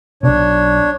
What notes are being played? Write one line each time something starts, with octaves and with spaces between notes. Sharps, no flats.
B1 B2 D4 C#5